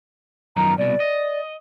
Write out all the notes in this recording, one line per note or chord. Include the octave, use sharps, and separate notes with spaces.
F#2 D#3 F3 A#5
C2 B2 D5
D#5